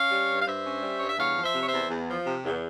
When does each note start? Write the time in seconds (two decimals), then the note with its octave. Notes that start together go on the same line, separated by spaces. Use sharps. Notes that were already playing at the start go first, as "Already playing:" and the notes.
Already playing: C#4 C#5 F5
0.11 G3
0.30 G2
0.40 F5
0.46 G2 C5 E5
0.65 C#4
0.82 G3
0.98 G2 C#5
1.09 E5
1.18 E2 C#5 F5
1.36 F3
1.43 C5 E5
1.55 C3
1.61 C#5
1.66 C5 E5
1.71 E2
1.90 E2
2.08 F3
2.26 C3
2.43 E2